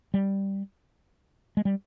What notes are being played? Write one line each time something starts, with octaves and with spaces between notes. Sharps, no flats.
G3
G#3
G3